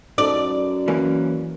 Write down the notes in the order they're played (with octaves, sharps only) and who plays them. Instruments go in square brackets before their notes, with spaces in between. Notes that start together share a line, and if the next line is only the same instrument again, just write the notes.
[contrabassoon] F#2 [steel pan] D#4 A4 [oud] D5
[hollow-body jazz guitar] E3 A#3 C#4